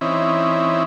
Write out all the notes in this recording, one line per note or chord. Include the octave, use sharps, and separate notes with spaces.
E3 C4 C#4 D#4 E4